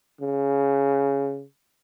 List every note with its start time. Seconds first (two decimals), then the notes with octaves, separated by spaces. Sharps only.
0.21 C#3